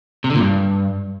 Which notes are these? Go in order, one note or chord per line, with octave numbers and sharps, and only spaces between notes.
C3
D3
A#2
G2